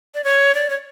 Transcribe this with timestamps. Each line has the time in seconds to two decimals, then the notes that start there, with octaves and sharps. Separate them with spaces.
0.14 D5
0.24 C#5
0.55 D5
0.70 C#5